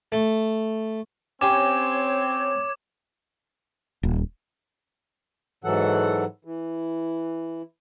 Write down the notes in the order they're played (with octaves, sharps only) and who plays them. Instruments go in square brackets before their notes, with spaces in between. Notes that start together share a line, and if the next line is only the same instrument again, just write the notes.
[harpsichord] A3
[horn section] C4 [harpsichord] C#4 G4 C6 [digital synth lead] C#5 [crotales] D6
[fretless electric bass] D#1
[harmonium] G#2 E3 F#3 A4 F#5
E3